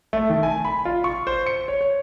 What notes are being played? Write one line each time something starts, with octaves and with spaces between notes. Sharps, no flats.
A3
D#3
G#5
B5
F4
C#6
C5
C#7
C#5
C#5